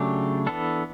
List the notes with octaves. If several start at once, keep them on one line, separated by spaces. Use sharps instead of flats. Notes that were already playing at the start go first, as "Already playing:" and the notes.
Already playing: C#3 F#3 A3 D4 G4
E3 B3 D4 A4